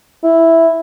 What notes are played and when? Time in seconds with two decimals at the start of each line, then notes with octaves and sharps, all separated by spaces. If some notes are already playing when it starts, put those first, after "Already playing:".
0.24 E4